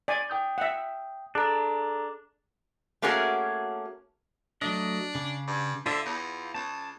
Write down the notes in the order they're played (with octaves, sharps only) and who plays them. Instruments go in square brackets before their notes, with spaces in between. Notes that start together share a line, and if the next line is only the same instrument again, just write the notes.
[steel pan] D5 G#5
[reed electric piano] G5 D#6 G6
[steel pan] E5 F#5
[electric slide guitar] D4 [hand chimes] G#4 A4 A#5
[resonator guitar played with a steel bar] A3 A#3 C#4 F#4 G#4 A#4
[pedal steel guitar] F#3 A3 D#5 [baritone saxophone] D4
[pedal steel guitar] C#3 D6
[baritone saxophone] G2
[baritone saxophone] D3 [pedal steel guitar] F4 C5 E5
[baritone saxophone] E2 [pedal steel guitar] F4
[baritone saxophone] C#2 [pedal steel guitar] A5